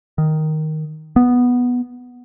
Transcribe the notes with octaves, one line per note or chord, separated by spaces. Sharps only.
D#3
B3